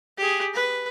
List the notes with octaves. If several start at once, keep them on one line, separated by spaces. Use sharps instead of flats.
G4 G#4
B4